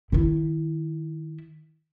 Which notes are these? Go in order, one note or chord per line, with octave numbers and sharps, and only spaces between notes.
D#3 E4